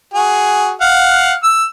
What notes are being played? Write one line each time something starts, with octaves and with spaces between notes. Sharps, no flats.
F#4 G#4
F5 F#5
E6